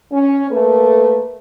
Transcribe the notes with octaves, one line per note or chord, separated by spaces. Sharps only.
C#4
A3 A#3 A4 B4